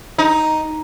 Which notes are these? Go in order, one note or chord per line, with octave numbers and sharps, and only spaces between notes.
D#4